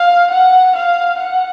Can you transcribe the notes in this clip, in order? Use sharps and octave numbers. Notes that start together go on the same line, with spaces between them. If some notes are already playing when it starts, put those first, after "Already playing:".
Already playing: F5
F#5
F5
F#5